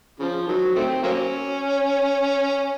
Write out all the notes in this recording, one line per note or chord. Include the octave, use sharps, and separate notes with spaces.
C#3 F3
D#3 F#3
D#3 A3 C4
F#3 A#3 C#4